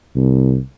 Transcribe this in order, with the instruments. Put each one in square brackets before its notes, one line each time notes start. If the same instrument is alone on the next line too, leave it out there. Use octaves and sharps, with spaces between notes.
[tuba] C2